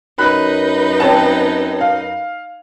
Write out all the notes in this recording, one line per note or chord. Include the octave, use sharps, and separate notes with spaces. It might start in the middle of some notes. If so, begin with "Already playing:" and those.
F#2 D#4 B4 B5 F#6
C4 C#5 A5
F5